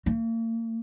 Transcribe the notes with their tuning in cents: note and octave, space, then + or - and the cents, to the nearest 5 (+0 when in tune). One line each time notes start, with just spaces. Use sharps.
A#3 -35